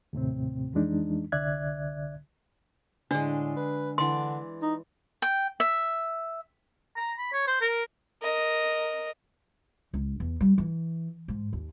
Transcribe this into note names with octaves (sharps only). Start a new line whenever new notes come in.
D#2 A2 C3 C4
F2 E3 G#3 D4 D#4
C2 D3 D5 E5 F#6 G#6
A2 D3 G#3 D4
B4
D3 E3 D5 C6
D#4
G5
E5
A#5
B5
C#5
C5
A#4
A#4 D#5
C#2
E2
G3
E3
G#2
D#2